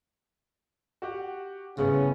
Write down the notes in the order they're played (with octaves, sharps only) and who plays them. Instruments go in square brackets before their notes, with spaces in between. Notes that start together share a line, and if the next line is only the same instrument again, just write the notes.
[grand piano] F#4 G4 F#5
[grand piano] G1 A2 B3 [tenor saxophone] C#3 [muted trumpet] C#4